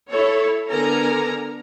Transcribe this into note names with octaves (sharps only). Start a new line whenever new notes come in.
E4 A4 C#5
D3 B3 A4 A#4 G#5 A#5